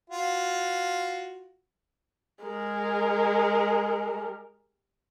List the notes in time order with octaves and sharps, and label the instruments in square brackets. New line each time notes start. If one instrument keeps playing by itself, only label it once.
[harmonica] F4 F#4
[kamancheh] G#3 A#4